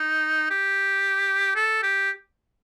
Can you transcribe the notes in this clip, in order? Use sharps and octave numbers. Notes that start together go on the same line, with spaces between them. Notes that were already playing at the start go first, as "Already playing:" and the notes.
Already playing: D#4
G4
A4
G4